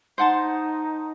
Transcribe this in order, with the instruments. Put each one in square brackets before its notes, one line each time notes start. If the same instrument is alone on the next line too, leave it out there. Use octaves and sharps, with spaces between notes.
[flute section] D#4 [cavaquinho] C5 F#5 A5 C6